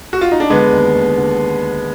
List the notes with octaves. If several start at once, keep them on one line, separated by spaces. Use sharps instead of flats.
F#4
F4
D#4
D4
D3 G#3 B3
D#2
D#2
D3